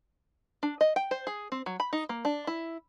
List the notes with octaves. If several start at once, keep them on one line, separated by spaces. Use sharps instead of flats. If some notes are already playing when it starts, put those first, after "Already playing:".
D4
D#5
G5
C5
G#4
C4
F#3
B5
D#4
A#3
D4
E4